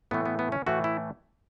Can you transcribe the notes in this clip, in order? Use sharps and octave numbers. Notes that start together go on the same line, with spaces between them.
A2 E3 A3 B3
B3
B3
C#4
A2 E3 A3 F#4
E4